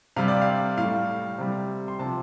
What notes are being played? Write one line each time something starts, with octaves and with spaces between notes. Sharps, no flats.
C3 G3 F5
D5
F5
A2 G3 F5
C3 G3
C6
C3 F3 A5